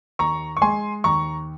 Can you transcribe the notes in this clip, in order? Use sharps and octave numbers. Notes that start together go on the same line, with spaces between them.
D#2 A#5 C#6
C#6
G#3 G#5 C6
D#2 A#5 C#6